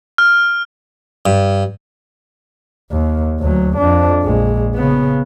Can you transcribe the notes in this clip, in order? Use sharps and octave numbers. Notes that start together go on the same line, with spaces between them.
F6
G2
D#2
D2 F#3
F2 D4
A#1 G#3
C#3 B3